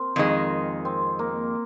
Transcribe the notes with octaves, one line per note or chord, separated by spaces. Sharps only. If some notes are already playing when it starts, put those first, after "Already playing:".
Already playing: C4 A#4
F2 D#3 G#3
C4
A#3